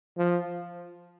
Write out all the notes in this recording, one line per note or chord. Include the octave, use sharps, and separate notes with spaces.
F3